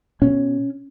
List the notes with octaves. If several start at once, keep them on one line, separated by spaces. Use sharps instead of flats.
B2 C#4